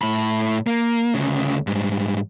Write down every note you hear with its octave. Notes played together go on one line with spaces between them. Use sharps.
A2 B5
A#3
D2 C#3
G#2 G3